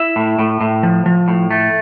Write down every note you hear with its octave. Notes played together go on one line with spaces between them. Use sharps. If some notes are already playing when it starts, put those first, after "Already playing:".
Already playing: E4 E5
A2
A2
A2
F3
F3
A2
A3